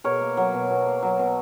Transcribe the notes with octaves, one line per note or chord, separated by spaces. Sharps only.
B2 A#4 C#5
A#3
F#3
B2
B2
A#3
F#3
B2